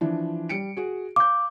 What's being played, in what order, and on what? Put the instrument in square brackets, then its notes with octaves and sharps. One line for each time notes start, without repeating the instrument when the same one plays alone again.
[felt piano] E3 F3 D4
G3 C#7 D7
F#4 G#4
[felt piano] F5 G6 [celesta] D6